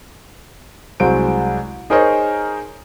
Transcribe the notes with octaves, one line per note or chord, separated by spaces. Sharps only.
C2 F#3 G#3 C5 D7
D#4 G#4 A#4 C5 C#5 D#5